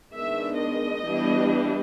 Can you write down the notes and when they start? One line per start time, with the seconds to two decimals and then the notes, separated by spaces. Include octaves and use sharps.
0.14 D#3 G#3 B3 D4 E5
0.60 D#5
1.06 E3 G3 B3 D4